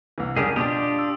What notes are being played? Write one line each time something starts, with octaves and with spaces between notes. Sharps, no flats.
C2 E3
G#1 C#2 G3 G4 G#4 A#4
B2 D4 F4 G4 D#6 D7
E6